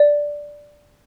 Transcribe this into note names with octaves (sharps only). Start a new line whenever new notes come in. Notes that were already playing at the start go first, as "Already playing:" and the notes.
Already playing: D5